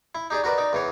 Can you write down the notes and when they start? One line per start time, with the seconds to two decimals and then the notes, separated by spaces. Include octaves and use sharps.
0.15 E4
0.30 D#4 G4 G#4 D5
0.44 F#4 A#4 B4 D5
0.58 D#4 D5
0.73 E2 E3 C#5